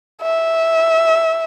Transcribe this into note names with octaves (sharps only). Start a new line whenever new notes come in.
E5